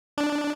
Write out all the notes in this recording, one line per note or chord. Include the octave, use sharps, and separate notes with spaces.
D4